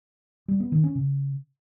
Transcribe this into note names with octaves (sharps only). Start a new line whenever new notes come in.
G3
B3
D#3
C#4
C#3